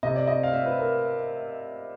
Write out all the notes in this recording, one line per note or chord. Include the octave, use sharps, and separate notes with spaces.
C3 D#5
D5
C4 D#5
F5
C4 E5
B4
C4 A#4